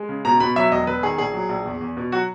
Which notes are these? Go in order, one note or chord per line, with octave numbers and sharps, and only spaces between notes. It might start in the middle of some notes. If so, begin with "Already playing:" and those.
Already playing: G#3
C#3
B2 A#5
B2 B5
F#3 E5
E1 D#5
E1 B4
D#3 G#4
A#1 G#4
F#3
A#1
E2
E2
B2
F#3 F#4